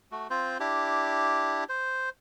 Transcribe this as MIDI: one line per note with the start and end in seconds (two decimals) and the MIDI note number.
0.12 0.28 57
0.12 0.28 66
0.30 0.58 60
0.30 0.58 65
0.30 0.58 72
0.60 1.64 62
0.60 1.64 64
0.60 1.64 67
1.69 2.09 72